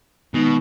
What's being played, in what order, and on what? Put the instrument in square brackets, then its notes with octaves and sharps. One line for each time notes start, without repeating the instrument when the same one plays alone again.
[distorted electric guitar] B2 [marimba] D#3 G#3 D#4